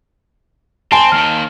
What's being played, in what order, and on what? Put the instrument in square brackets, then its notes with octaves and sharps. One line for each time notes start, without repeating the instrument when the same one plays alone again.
[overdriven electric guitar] C4 [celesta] G#5 C6 D7 [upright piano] A5
[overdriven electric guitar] D#2 D#3 [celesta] F6